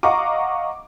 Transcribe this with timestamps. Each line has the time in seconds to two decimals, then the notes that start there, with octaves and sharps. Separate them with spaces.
0.03 D#5 F5 F#5 A#5 C#6 D6